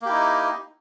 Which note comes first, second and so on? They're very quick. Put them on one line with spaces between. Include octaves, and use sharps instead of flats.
A#3 G4 E4 D#4